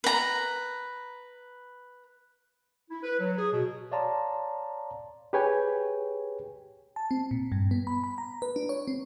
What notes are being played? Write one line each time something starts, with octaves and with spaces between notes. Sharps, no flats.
B4 A#5
E4
B4
F#3
G#4
B2
C#5 D5 F5 A5 A#5 C6
G4 G#4 B4 C#5 G5 G#5
A5
C4
A#2
G2
B3
B5
B5
A#5
B4
D4
C#5
C4